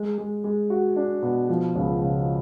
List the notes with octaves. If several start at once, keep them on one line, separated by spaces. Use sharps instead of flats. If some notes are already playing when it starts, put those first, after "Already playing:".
Already playing: G#3
G#3
G#3
F#4
D4
B2
F3
C#2
C#3